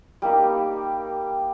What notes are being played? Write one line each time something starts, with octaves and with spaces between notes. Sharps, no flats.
G3 A#3 D#4 G4